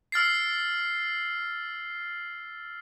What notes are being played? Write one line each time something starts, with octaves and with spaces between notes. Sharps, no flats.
E6 F6 A6 C7